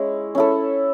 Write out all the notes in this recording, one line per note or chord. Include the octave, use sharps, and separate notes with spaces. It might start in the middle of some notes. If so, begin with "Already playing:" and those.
Already playing: G#3 C#4 E4
C#4 E4 A4